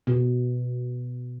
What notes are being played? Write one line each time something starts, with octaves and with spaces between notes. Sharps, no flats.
B2